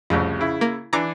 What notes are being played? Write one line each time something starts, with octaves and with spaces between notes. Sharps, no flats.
C2 F2 A2 C#3
C#3 E4
A#3
E3 D4 A#5 D6